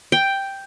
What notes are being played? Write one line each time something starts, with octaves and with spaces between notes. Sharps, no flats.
G5